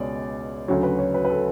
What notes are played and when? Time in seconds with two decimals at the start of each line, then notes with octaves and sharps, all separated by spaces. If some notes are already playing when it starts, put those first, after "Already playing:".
Already playing: C#2 B2 G#3 C#5 D5
0.68 D2 C#3 F#3 C#5
0.83 B4
0.99 C#5
1.14 B4
1.25 B4
1.30 A4